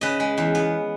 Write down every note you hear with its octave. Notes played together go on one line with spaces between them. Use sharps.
C#3 B4 D#5
G#3
E2
B3